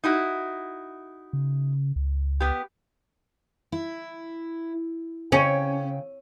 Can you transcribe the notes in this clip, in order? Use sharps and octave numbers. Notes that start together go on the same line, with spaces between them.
D#4 E4 F#4
C#3
C#2
B3 G4
E4
C#3 C#4 G5